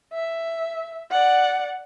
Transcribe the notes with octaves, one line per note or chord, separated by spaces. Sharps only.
E5
D5 F#5